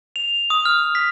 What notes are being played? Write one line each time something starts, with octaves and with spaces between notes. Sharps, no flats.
F7
D#6
F6
B6